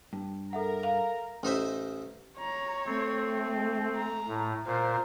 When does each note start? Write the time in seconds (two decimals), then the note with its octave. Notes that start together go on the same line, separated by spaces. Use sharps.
0.13 G2
0.53 A4 A#4 E5 F#5 A#5
0.83 F5
1.43 A1 D#4 C5 E5
2.39 C#5 A#5
2.86 A3 C4
3.96 A#5
4.28 A2
4.66 A#2 A#4 C5